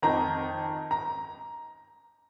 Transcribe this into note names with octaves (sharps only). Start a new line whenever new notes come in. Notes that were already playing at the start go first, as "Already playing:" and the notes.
F2 D#3 A#5
A#5